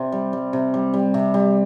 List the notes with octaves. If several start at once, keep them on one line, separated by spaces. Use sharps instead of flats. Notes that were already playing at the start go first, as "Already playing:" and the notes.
Already playing: C3 C5 D5
G3
G3
C3
G3
G3
C3
G3